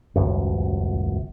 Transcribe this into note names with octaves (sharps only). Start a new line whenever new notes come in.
D#1 G#1 C#2 F#2